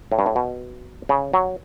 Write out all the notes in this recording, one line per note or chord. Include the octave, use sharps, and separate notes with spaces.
A2
G2
A2
B2
C#3
F#3